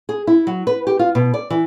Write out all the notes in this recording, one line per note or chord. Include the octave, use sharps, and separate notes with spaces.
G#4
E4
F#3
B4
G4
F4
B2
D5
E3